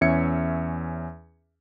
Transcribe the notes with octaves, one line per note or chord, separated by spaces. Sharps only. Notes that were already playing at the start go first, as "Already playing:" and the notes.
E2 C#4 E5 G#6 C#7